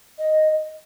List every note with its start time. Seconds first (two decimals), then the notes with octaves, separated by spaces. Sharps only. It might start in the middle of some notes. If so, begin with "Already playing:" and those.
0.18 D#5